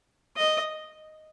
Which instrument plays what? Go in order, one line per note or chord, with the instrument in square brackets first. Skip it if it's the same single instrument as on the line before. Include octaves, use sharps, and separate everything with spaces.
[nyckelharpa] D#5